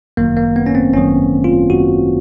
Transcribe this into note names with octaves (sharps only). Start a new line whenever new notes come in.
G1 F#2 D#3 F#3 A#3
A#3
B3
C#4
C4
G1 F#2 D#3 F#3 C#4
F4
G1 F#2 D#3 F#3 F#4